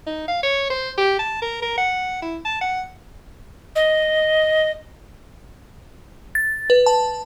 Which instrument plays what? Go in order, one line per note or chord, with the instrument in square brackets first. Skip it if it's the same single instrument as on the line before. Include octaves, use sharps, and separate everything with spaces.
[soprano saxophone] D#4
F5
C#5
C5
G4
A5
A#4
A#4
F#5
E4
A5
F#5
[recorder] D#5
[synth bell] A6
B4
A5